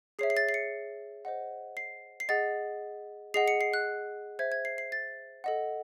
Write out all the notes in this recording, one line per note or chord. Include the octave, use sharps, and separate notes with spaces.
G#4 C#5 E5 C7
C7
A6
C7
C#7
C5 D#5 F#5
C7
C7
G#4 D#5 F#5 A6
G#4 D#5 F#5 C7
C#7
C7
F#6
C5 E5 G#6
G#6
C7
C7
A6
A4 D#5 F#5